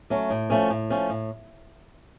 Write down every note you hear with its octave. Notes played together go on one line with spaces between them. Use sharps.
F#3 A3 C#4
A2
F3 A3 C#4
A2
F3 A3 C#4
A2